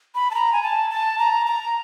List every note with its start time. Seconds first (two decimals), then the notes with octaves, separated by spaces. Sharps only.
0.15 B5
0.31 A5
0.35 A#5
0.53 G#5
0.62 A5
0.90 A5
1.19 A#5
1.47 A#5